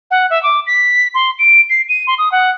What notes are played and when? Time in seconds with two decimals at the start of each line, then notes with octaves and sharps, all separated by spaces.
0.11 F#5
0.30 E5
0.43 D6
0.67 B6
1.14 C6
1.39 D7
1.70 C7
1.89 D#7
2.07 C6
2.18 D#6
2.32 F#5